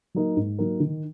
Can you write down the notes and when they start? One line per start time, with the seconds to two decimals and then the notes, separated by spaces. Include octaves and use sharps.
0.15 F#3 A#3 D#4 A#4
0.37 G#2
0.59 F#3 A#3 D#4 A#4
0.80 D#3